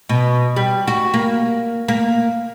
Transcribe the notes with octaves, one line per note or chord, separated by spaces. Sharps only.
B2
G3
F#4
A#3
A#3